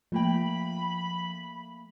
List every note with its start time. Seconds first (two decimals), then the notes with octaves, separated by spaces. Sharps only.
0.12 F3 A3 A#3 G5 B5